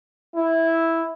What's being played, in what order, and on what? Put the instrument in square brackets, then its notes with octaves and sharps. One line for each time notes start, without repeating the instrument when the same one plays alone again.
[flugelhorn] E4